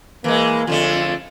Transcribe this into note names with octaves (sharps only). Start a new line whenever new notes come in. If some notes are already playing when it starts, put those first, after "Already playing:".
E3 G#3 A#3
F2 D3 A3 F4